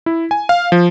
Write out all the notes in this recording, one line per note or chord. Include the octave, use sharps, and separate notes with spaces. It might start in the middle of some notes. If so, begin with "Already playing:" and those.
E4
G#5
F5
F3